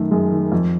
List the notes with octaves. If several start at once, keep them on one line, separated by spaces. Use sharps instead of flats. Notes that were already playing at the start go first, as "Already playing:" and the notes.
Already playing: F#2 D#3 A3
F#2 G#3
D#3
F2